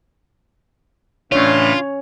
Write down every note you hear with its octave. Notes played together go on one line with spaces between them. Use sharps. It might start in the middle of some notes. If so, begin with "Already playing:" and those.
A2 C#3 E3 A3 C#4 D4 F4 C#5